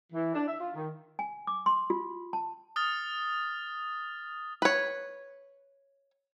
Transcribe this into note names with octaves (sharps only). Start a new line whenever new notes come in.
E3
D4
E5
F4
D#3
G#5
D6
C6
F4
A5
D#6 F6 A6
B4 C#5